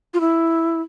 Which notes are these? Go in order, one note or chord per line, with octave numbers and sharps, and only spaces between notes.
F4
E4